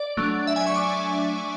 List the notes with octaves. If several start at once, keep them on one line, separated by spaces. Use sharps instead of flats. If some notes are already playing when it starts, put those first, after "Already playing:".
Already playing: D5
F#3 A3 D4
E5
G#5
C#6
D6